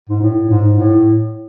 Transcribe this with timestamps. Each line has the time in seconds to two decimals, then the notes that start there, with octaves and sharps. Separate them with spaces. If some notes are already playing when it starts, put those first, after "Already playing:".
0.09 G#2
0.22 A2
0.50 G#2
0.80 A2